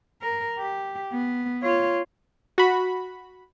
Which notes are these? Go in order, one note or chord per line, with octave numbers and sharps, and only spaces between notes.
A#4
G4
B3
F4 C#5
F#4 B5